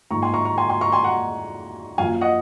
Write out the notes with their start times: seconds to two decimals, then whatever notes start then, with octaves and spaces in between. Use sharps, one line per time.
0.11 G#2 F3 A#3 A#5 C#6
0.22 G#5 C6
0.34 A#5 C#6
0.45 A#5 C#6
0.58 G#5 C6
0.70 G#5 C6
0.81 A#5 C#6
0.92 G#5 C6
1.04 F#5 A#5
1.98 F#2 F3 A#3 F5 G#5
2.21 D#5 F#5